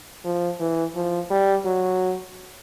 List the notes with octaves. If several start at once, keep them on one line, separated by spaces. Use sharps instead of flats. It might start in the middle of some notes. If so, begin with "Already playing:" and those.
F3
E3
F3
G3
F#3